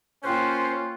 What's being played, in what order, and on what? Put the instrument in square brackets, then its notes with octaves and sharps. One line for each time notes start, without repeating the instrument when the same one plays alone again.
[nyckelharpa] A#3 F4 [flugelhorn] C#4 [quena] C5 [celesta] G5 F#6 G6